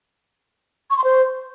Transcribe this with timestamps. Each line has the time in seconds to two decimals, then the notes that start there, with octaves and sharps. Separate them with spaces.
0.90 C#6
0.97 C6
1.04 C5